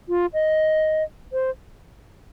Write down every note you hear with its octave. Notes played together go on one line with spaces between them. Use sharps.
F4
D#5
C5